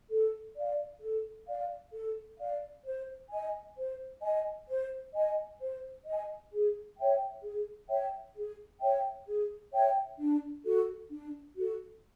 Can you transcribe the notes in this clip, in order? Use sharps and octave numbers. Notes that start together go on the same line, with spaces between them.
A4
D5 F5
A4
D5 F5
A4
D5 F5
C5
D#5 G#5
C5
D#5 G#5
C5
D#5 G#5
C5
D#5
G#5
G#4
C#5 E5 G5
G#4
C#5 E5 G5
G#4
C#5 E5 G5
G#4
C#5 E5 G5
D4
F#4 A4
D4
F#4 A4